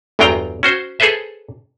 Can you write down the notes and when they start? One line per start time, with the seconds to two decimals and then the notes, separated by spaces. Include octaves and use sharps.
0.19 G1 E2 F#3 F4 G5 A#5
0.63 C#4 F#4 C5
1.00 G#4 A4 B4 C5 E5